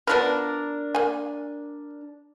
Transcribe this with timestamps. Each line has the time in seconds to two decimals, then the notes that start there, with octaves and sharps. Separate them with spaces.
0.07 B3 D4 F4 A#4 B4
0.95 A#3 G#5